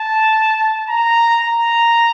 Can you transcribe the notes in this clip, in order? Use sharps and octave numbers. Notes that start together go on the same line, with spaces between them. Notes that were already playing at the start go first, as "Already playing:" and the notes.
Already playing: A5
A#5
A#5